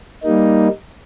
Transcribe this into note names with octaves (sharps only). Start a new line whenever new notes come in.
G3 A#3 D#4